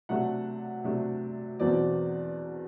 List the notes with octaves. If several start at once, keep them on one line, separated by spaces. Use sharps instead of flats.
C3 F#3 A3 D4 F#5
C3 F#3 A3 D4
E2 B2 F#3 C4 D5